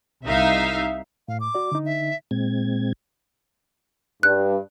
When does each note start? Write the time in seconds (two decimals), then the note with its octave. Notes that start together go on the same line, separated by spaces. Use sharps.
0.25 C2 D#4 E5 F5
1.28 A2 F5
1.40 D6
1.55 F#4 D5
1.72 D3 D#4
1.86 E5
2.31 A#2 G#3 C4 G#6
4.23 G2 F#6